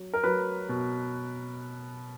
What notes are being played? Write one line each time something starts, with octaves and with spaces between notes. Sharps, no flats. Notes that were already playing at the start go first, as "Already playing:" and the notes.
Already playing: F#3
A#4
F#3 B4
B2